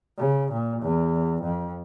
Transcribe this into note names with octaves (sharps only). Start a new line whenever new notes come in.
C#3
A#2
E2
F2